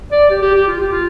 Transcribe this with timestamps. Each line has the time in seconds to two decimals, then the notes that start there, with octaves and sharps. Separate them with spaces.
0.11 D5
0.30 G4
0.42 G4
0.55 G4
0.68 F4
0.80 G4
0.92 F4